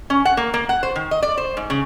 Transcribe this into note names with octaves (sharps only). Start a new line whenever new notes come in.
C#4
F#5
A#3
A#3
F#5
C5
D#3
D#5
D5
C5
G#2
C#3